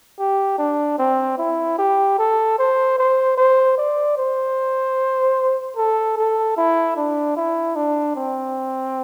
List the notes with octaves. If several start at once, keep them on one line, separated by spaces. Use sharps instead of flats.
G4
D4
C4
E4
G4
A4
C5
C5
C5
D5
C5
A4
A4
E4
D4
E4
D4
C4